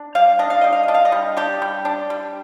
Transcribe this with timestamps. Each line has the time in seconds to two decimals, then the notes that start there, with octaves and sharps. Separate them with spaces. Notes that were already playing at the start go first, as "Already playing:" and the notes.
Already playing: D4
0.15 G3 F5
0.39 D4 D#5
0.50 F5
0.61 G3 D#5
0.72 F5
0.83 D#5
0.88 D4
0.94 F5
1.05 D#5
1.12 G3
1.37 D4 G4
1.62 G3
1.85 D4
2.10 G3